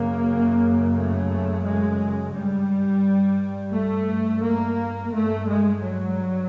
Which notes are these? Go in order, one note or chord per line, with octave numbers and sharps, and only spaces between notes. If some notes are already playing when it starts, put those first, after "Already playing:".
Already playing: F#2 C#3 A#3
A3
G#3
G2 G3
A3
A#3
G2 A3
G#3
F#3